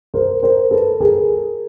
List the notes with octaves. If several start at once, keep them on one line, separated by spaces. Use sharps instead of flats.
A#4 C5
A#4 C5
A4 B4
G#4 A#4